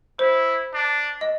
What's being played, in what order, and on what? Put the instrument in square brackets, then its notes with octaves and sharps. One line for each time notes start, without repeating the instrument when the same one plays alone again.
[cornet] E4 [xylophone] C5
[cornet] D4
[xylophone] D#5